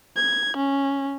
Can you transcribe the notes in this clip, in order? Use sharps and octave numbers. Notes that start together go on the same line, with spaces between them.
G#6
C#4